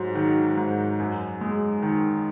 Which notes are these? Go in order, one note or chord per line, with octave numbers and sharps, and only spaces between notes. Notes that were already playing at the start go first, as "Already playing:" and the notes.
Already playing: G#2 F#3
D#3
G#2
F#2
G#3
D#3